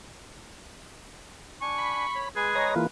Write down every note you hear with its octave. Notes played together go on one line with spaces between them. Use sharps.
D4 G#5 C#6
B5
C#5
G#3 G#4 B4
C#5 D#5 A#5
E3 A#3 F4